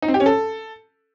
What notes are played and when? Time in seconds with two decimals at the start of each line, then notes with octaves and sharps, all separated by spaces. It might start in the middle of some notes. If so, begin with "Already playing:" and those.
0.02 D#4
0.08 C4
0.14 G4
0.20 C#4
0.26 A4